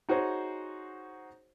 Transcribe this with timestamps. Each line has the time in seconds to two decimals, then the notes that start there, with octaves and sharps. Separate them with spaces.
0.09 D#4 F#4 G#4 C5 C#5